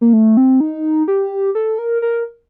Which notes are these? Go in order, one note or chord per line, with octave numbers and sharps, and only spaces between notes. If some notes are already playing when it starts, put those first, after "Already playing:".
A#3
A3
C4
D#4
G4
A4
A#4
A#4